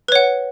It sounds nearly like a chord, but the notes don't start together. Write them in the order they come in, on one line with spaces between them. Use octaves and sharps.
B4 C#5 F#5